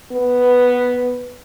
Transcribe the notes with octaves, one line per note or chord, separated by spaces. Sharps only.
B3